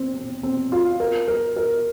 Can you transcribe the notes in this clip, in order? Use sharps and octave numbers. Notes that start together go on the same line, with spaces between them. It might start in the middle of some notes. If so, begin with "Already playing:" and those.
Already playing: C4
C4
C4
F4
A#4
A#4
A#4